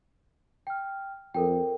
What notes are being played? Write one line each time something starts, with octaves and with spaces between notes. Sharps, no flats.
G5 F6
F2 A4 A#4 G5